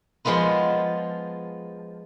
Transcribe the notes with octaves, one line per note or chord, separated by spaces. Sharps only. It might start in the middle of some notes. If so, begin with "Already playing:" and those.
F3 G#3 B3 F4 B4